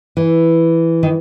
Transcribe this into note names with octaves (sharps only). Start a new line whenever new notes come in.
E3
D#3